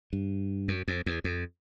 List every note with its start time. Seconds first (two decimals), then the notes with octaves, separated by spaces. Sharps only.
0.13 G2
0.68 F#2
0.88 F2
1.06 E2
1.24 F2